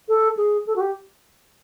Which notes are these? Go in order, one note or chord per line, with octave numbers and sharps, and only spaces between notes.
A4
G#4
A4
F#4
G4